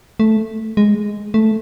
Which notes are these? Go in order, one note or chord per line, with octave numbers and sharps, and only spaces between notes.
A3
G#3
A3